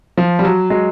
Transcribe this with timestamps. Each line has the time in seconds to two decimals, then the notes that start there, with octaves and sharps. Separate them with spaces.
0.17 F3
0.39 G3
0.45 F#3
0.70 F#3 G#3